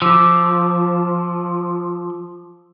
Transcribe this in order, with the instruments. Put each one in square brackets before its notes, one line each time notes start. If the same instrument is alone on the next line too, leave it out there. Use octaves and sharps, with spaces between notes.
[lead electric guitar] F3 [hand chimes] F4 D6 E6